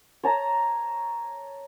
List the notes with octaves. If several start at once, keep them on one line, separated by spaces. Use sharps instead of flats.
C#5 A5 A#5